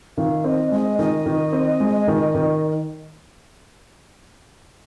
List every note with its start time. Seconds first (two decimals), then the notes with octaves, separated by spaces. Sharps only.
0.17 D#3 F5
0.44 C4 D#5
0.72 G#3 D#5
0.99 D#3 D#5
1.26 D#3
1.53 C4
1.80 G#3
2.08 D#3
2.35 D#3